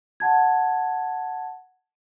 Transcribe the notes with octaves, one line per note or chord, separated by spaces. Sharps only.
F#5 A5 G#6